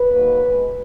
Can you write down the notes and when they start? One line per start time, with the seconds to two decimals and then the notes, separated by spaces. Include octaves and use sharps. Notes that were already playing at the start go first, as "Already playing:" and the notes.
Already playing: B4
0.12 G#2 D#3 F#3 A#3
0.41 B2 G#3